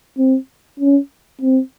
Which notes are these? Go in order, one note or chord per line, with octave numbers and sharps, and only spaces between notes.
C4
C#4
C4